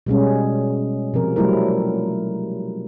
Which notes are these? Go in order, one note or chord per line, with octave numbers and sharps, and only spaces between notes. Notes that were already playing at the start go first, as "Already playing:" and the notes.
B2 G3 G#3 C#4
C3 F3 A#4
F#3 G3 A3 E4 A#4